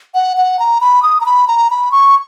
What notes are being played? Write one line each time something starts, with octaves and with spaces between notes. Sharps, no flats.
F#5
F#5
A#5
B5
D#6
A#5
B5
A#5
B5
C#6